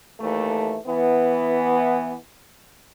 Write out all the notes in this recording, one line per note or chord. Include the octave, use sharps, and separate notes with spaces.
D#2 E3 A3
E3 B3